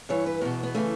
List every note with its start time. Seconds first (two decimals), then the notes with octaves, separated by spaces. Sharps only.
0.09 G2 E3 C#5
0.26 B4
0.41 E2 B2 G4
0.63 B3
0.75 C#3 E3 A3